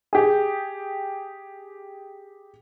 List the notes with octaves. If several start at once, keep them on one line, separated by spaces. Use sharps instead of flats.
G4 G#4